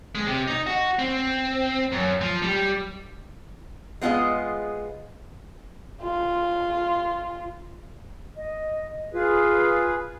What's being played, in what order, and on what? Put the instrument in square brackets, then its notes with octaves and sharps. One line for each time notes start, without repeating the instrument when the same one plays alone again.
[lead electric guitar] G#3
C3
D#4
F#4
C4
F#2
F3
G3
[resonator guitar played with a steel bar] G#3 B3 F4 G#4 D#5
[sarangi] F4
[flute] D#5
[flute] F4 [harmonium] G#4 B4